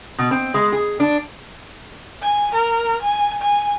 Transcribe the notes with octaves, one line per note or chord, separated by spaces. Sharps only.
B2
C4
G#3
G#4
D4
G#5
A#4
G#5
G#5